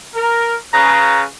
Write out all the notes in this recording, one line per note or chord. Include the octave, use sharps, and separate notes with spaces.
A#4
C#3 B4 A#5